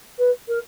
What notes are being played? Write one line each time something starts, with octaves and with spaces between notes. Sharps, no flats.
B4
A#4